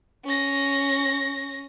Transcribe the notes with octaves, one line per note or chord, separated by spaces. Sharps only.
C#4 A#6